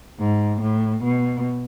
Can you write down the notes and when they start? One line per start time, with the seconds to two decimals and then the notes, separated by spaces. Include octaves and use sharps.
0.19 G#2
0.61 A2
1.04 B2